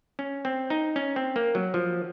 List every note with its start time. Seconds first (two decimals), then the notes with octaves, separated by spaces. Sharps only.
0.19 C#4
0.45 C4
0.70 D#4
0.96 C#4
1.16 C4
1.36 A#3
1.55 F#3
1.74 F3